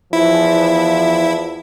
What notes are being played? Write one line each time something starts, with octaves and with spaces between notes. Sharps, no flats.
E2 F3 E4